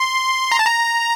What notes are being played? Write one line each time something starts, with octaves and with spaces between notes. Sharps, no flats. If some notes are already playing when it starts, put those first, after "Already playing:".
Already playing: C6
A#5
A5
A#5